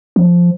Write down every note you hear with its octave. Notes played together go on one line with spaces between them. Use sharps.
F3